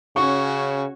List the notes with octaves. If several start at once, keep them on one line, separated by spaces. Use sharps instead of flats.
C#3 C#4 F#4 C#6